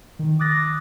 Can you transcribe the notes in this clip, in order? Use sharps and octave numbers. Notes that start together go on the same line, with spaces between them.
D#3
D6 D#6 F#6 A6 A#6